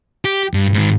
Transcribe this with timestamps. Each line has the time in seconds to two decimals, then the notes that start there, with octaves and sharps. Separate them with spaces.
0.25 G4
0.54 G2
0.74 G#2 D#3